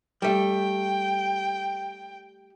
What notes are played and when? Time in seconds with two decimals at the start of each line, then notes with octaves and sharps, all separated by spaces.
0.22 G3 A3 G5